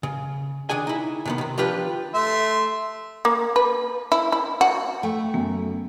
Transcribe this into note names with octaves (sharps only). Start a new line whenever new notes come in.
C#3
D#3 D4 G#4 G#5
D#4 E4
C3 D#3 B3
C3 D#3
F3 D4 F4 G4 B4
A3 E5 C6
A#3
B4
E4
E4
F#4
A3 G5
F#2 B3